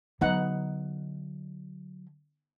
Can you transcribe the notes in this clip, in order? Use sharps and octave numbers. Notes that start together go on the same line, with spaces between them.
D3 F#3 B3 D#4 F#5